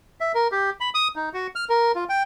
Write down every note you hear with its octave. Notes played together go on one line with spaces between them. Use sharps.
E5
A#4
G4
B5
D#6
D#4
F#4
F6
A#4
F4
G5